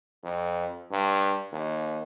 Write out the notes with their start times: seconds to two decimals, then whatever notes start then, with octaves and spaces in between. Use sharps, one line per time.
0.24 F2
0.91 G2
1.52 D#2